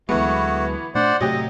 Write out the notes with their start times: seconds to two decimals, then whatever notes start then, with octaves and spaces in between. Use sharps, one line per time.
0.09 D2 E3 F#3 G#3 A3 B3 F#4
0.95 A#2 A3 D4 C5 D5 F#5
1.21 A2 C3 F#3 A3 G4 D#5